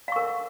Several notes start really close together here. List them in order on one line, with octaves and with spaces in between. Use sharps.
F5 C#6 A#4